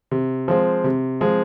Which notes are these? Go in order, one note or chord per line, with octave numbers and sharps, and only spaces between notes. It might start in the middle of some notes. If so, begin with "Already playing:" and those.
C3
F3 G#3 C4
C3
F3 G#3 C4